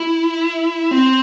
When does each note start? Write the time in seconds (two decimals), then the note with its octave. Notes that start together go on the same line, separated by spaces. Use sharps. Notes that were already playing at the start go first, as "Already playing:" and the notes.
Already playing: E4
0.91 C4